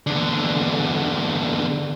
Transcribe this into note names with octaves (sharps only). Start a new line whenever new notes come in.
E2 D3